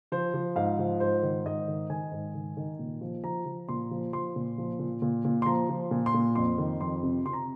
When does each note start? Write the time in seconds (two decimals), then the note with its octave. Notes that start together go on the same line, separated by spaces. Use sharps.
0.12 F3 C5
0.34 F3
0.56 G#2 F5
0.79 F3
1.00 G#2 C5
1.23 D#3
1.45 G#2 D#5
1.68 D#3
1.90 D#3 G#5
2.12 G#2
2.35 D#3
2.57 D#3
2.79 A#2
3.01 F3
3.24 F3 A#5
3.46 F3
3.69 A#2 C6
3.91 F3
4.13 F3 C6
4.36 A#2
4.58 F3
4.79 A#2
5.02 A#2
5.25 A#2
5.42 C6
5.46 F3 A#5
5.69 F3
5.91 A#2
6.06 C6
6.14 A#2
6.35 F2 C6
6.58 D#3
6.81 F2 C6
7.03 C3
7.25 C3 C6
7.33 A#5